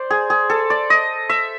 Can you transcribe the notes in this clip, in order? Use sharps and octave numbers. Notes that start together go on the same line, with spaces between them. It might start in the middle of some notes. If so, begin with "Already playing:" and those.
Already playing: C5 D5
G#4
G#4
A4
D5
D#5
E5